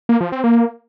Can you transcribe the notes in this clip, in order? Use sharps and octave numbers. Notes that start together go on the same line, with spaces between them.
A#3
F3
C4
A#3